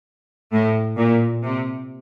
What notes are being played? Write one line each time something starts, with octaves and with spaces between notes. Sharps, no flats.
A2
A#2
C3